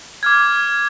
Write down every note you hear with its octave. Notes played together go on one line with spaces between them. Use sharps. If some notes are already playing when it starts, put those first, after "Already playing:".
D6 F6 G#6